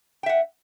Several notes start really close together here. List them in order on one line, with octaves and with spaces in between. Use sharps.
G5 E5 F#5